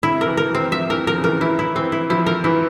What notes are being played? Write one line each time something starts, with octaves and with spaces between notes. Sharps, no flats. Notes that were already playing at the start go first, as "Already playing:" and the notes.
C3 E4
A#4
E3
A#4
E3 C4
F3 E5
E3 A#4
F3 A#4
C#3
E3 A#4
E3 E4
E4
E3 C4
E4
F3 E4
A#4
E3 E4